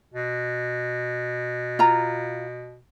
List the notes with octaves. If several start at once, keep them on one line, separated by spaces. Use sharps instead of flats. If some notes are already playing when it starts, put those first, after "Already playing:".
B2
F4 A#5